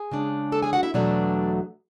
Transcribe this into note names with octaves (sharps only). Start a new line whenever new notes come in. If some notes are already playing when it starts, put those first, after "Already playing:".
Already playing: G#4 G#5
C#3 G#3 D4
A4 A5
G#4 G#5
F#4 F#5
E4 E5
E2 B2 F#3 A3 D4 D5